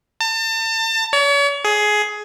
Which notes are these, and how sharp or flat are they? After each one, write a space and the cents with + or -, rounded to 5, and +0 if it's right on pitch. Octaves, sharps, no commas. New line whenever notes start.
A5 +35
C#5 +40
G#4 +15